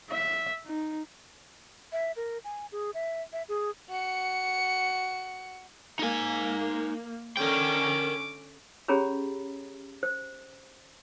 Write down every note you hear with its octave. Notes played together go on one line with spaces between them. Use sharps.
E5
D#4
E5
A#4
G#5
G#4
E5
E5
G#4
F#4 C#7
A#3 D#4 G#5
D3 C#4 A#4 G5 D6
C#4 G4 G#4 C#5 A#5 B5
C5